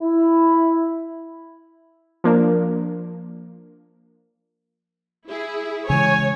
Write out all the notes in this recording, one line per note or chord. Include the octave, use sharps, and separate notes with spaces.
E4
F3 A#3 D4
E4 G#4
C#3 E3 G#3 C#5 G#5